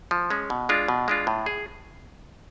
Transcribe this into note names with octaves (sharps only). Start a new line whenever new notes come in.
F3
G#3 C#4
B2
G#3 D4 F4
B2
G#3 D4 F4
A2
G#4